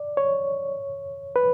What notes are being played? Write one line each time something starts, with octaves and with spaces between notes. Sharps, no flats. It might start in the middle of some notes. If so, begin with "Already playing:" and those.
Already playing: D5
C#5
B4